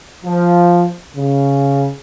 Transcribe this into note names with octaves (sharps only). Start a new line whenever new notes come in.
F3
C#3